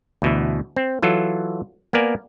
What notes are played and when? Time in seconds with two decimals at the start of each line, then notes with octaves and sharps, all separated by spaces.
0.22 D2 B2 E3
0.76 C4
1.02 E3 F#3 F4 A4
1.93 A#3 B3 A#4 D5 G#5